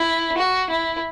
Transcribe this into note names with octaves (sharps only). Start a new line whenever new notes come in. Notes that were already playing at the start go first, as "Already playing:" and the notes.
Already playing: E4
F#4
E4